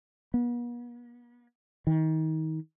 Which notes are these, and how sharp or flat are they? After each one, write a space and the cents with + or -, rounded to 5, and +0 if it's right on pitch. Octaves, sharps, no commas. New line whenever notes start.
B3 -45
D#3 +25